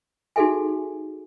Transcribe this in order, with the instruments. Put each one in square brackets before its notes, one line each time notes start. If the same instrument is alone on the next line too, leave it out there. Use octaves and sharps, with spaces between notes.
[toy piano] D#4 F#4 G#4 A4 E5 G#5